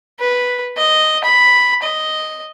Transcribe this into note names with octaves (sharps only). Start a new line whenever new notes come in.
B4
D#5
B5
D#5